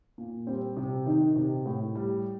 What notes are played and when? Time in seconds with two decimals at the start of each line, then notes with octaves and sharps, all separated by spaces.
0.18 A#2
0.47 G3 C4
0.77 C3
1.06 D#3 D#4
1.36 C3
1.66 A2
1.95 G3